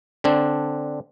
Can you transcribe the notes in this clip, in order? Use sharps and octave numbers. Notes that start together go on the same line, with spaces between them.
D3 C4 D4